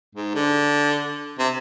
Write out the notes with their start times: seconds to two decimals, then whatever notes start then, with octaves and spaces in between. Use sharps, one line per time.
0.15 G#2
0.35 D3
1.39 C3